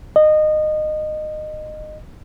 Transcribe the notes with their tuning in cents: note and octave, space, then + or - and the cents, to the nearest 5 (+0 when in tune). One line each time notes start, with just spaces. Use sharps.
D#5 -20